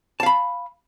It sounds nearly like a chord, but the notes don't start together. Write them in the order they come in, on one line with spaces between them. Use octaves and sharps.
A5 F5 B5